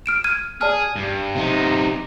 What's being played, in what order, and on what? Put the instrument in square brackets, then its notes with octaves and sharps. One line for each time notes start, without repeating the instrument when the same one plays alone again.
[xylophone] F6 D7 E7
F6 G#6 D#7
[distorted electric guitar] G#4 [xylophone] D5 A5 F6
[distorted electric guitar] G2
C3 D#4